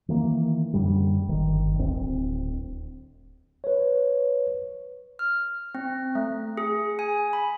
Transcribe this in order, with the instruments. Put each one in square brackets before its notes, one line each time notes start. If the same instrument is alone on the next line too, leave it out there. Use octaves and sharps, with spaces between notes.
[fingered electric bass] D#3 E3 A#3
F#2 D3 G3
G1 D#3
D1 C4
[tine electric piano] B4 C#5
[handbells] F6
C4
A3
G#4
G#5
B5